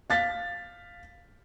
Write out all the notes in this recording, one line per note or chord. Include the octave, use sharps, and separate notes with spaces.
F5 A6 B6